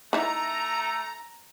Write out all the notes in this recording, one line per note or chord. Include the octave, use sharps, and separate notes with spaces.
A3 D#4 E4 A#5